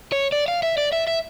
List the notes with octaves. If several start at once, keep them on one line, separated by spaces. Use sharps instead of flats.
C#5
D5
F5
E5
D5
E5
E5